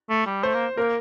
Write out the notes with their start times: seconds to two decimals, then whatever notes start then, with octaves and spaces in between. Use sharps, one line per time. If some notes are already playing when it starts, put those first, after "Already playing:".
0.09 A3
0.26 G3
0.43 A3 C5
0.54 A#3
0.77 A#3 A#4